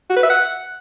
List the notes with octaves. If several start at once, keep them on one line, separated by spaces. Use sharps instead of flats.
F#4
B4
E5
F#5